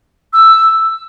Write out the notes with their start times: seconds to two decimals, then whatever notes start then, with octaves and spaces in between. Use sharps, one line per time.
0.33 E6